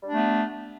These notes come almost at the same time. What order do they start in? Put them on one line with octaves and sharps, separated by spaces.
G3 D4 A3 B3